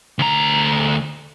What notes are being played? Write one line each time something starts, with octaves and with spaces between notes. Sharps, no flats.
D2 A#5